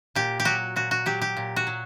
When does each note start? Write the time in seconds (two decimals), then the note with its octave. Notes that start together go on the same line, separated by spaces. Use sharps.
0.15 A#2 G4
0.40 G4
0.45 F#3 F#4
0.76 A#2 F#4
0.91 F#4
1.06 F#3 G4
1.22 G4
1.37 A#2
1.56 F#4
1.67 F#3